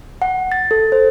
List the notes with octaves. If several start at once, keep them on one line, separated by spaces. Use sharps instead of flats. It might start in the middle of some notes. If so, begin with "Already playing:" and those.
F#5
A6
A4
C5